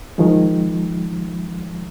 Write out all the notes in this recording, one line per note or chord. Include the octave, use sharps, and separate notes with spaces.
D#3 F3 G#3